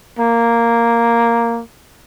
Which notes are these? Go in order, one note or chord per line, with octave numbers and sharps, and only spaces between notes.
A#3